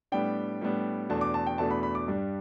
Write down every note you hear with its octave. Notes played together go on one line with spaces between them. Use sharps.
A2 G3 B3 D4 G5
A2 G3 B3 D4
E2 B2 A3 D4 A5
D6
A5
G5
E2 B2 A3 D4 A5
B5
B5
D6
G2 G3 D4